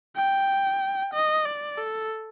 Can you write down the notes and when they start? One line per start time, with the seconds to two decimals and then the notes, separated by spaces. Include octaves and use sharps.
0.16 G5
1.14 D#5
1.45 D5
1.78 A4